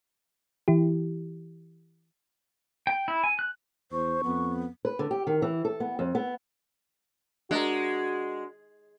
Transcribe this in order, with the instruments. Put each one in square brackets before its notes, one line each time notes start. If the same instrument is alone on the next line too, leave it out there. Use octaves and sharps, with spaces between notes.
[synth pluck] E3 E4 G4
[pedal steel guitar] G5
E4
G#5
F#6
[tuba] E2 [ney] C5 [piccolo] C#6
[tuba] F2 [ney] B3
[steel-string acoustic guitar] B4
D3
G4
D#3
E3
A4
B3
F2
B3
[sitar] G#3 [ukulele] D4 A#4 [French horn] F#4